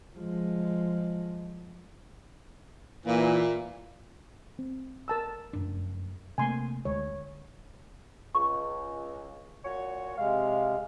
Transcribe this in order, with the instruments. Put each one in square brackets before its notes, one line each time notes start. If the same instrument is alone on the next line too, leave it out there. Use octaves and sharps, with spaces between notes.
[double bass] F3 G#3
[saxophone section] A#2 [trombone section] E3
[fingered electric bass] C4
[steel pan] A#4 A5 E6
[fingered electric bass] F1 F#2 D4
[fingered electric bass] C3 A3 A#3 [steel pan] G#5 C6
[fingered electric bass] D2 G#3 [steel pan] C#5
[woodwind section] C#2 [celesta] C#6
[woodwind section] A#2 F#4 C#5
[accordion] C3 G#3 [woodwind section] F5